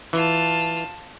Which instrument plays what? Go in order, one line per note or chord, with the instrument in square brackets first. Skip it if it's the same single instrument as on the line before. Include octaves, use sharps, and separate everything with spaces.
[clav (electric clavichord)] E3 [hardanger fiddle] F4 A5